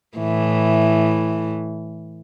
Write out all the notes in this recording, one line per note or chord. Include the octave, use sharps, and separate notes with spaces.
A2 E3